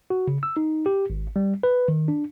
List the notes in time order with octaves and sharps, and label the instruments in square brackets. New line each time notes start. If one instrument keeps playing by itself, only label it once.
[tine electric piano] F#4
C#3
E6
D#4
G4
G#1
G3
B4
D#3
D4